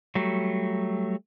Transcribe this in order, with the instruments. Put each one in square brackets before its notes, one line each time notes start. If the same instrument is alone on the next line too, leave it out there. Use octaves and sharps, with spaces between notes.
[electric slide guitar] F#3 G3 A3